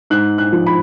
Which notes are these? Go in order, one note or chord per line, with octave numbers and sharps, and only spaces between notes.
G#2 F#6
F#6
F3
B5